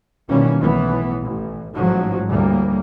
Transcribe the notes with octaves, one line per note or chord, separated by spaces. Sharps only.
B2 D#3 E3 G3 A#3 C#4
B1 A2 E3 B3
A1
A1 G#2 F3 F#3
D2 A2 G3 A#3